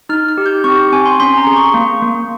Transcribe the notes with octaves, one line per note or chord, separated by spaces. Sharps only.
D#4 F6
F6
G4
G6
C4 C#6
C4 G#5
C6
C#4 C6
A#5
G#4
C#6
A#3
A#3